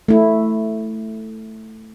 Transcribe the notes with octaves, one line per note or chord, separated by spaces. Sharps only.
A3 E4